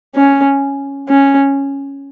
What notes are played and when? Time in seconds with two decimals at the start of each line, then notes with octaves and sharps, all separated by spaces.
0.15 C#4
1.09 C#4